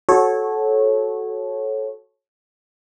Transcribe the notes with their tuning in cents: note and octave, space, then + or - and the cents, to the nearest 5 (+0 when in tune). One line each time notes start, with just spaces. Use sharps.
F#4 +0 A4 -20 C#5 -20